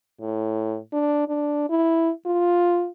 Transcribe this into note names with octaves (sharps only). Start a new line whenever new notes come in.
A2
D4
D4
E4
F4